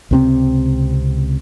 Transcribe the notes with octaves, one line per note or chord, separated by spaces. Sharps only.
C#2 C3 C4